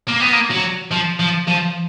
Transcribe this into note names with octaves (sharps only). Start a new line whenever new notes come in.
A#3
B3
A#3
F#3
F3
F3
F3